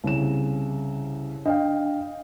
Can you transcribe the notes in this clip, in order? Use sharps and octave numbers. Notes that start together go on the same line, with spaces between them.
C2 C#3 E7
D4 D#5 F5 G5